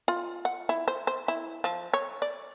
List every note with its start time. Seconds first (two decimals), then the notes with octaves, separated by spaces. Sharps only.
0.08 F4
0.45 F#5
0.69 E4
0.88 C5
1.07 C5
1.28 E4
1.64 F3
1.94 C#5
2.22 D5